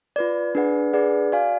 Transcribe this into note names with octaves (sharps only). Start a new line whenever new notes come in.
F4 B4 D5
D4 G#4 B4 D5 F#5
D4 G#4 B4 D5 F#5
F#4 D5 F5 G#5